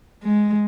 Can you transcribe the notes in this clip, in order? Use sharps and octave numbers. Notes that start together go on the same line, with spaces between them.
G#3